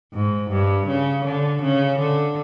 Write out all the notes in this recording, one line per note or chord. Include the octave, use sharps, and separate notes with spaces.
G#2
G2
C#3
D3
C#3
D3